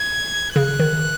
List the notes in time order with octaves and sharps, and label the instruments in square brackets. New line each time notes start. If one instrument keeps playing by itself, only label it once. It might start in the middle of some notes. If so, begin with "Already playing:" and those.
Already playing: [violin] G#6
[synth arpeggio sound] C#3 [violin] F#6
[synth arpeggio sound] D#3